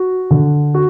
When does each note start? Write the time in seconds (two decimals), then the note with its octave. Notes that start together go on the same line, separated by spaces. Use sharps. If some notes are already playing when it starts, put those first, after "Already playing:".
Already playing: F#4
0.31 D3
0.75 F#4